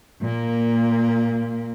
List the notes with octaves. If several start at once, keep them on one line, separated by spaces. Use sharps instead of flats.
A#2 A#3